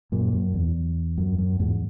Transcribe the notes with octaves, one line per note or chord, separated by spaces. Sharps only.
F#2 A#2
F#2
E2
F#2
F#2
E2 G#2